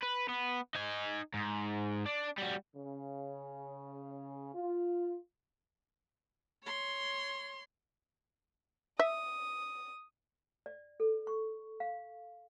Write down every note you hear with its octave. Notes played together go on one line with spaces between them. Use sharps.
B4
B3
D#4 G#5
G#2
D4
G3 F#4
C#3
F4
C#5 C6
E5 D#6
D5
A4
C#6
F5